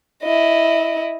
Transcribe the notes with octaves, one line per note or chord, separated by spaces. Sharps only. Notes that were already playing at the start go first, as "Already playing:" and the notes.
E4 D#5